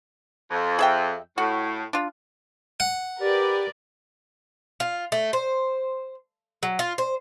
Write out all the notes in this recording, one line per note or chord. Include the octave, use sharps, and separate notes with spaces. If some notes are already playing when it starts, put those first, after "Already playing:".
F2
G#4 E5 G5
A2 F#4
D4 F4
F#5
G4 A#4 B4 D5
F4
A3
C5
F#3
F4
C5